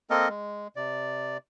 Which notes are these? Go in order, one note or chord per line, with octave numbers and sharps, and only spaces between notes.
A#3 C4 A4 A#4 D#5
G#3
C3 D5